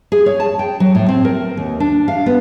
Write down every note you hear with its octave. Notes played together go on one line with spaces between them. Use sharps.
G#4
C#5
A5
G5
F#3
A2
C4
A#4
D#2
D4
F5
B3